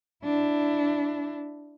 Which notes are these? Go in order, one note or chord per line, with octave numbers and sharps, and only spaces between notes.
D4 E4